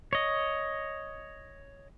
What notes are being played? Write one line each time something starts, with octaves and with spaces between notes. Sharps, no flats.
C#5 D#5